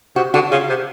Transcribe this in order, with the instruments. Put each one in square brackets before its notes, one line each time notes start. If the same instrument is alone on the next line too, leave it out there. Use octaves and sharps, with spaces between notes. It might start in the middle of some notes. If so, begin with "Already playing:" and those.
[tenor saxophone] C3 [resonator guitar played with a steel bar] F#4
[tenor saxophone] D3 [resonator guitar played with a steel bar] F#4
[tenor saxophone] C#3 [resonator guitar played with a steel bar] F4
[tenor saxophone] C3